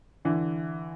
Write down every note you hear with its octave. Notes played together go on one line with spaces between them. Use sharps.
D3 E3